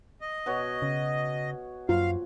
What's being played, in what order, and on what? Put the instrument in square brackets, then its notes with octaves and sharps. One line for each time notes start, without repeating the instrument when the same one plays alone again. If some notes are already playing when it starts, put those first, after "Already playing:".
[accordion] D#5
[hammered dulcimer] B2 F#4 C#5
[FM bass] C#3
[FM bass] F#2 [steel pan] F4 [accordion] F5